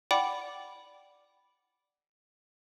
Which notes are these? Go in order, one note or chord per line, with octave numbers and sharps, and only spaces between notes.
D5 F#5 G5 B5 D6